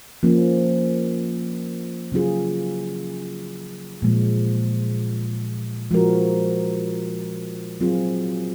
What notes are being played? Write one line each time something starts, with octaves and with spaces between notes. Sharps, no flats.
F3 A#3 C#4
C#3 F#3 C#4 F4 G#4
A#2 F3 G#3
F3 G#3 C#4 F#4 A#4
F#3 C4 F4 G#4